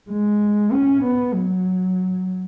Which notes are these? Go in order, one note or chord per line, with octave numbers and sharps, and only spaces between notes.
G#3
C#4
B3
F#3